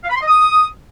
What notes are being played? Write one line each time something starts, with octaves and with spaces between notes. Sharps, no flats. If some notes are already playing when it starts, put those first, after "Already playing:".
F5
B5
C6
D#5
D#6